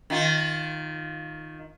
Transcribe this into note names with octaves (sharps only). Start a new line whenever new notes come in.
D#3 F4